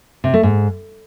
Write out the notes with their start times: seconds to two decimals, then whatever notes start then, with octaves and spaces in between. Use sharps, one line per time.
0.24 C3
0.34 A3
0.43 G#2